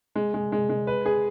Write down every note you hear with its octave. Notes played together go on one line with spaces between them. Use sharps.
G#3
G#3
G#3
G#3
B4
G#4